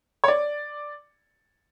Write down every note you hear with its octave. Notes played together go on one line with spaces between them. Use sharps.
C#5
D5